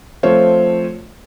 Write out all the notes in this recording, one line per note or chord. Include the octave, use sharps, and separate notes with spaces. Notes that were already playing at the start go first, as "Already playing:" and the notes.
F3 A3 C4 F4 C5 C#5